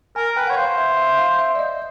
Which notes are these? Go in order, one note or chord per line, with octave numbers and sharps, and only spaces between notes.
A#4 G#5
B4 G5
C#5 F#5
C5 F5
E5
E5
F5
E5
D5
D#5